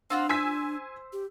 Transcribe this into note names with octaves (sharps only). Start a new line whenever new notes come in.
C4 D4 F4 F#4
C5 G#5 E6 B6
G4